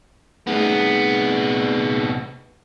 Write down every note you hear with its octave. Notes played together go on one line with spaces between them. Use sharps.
C2 A3 B3 D#4 G#4